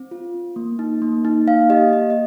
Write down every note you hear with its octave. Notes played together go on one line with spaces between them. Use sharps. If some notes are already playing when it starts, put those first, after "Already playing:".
Already playing: C4
F4
C4
A#3
D#4
A#3
D#4
A#3 F5
G4 D#5
A#3 D#5
D#5